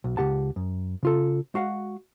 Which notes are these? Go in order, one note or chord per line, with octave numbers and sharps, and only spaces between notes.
B1
C#2 F#2 G4 F#5 A5
F#2
C#3 F4 A4
G#3 F#4 F5 F#5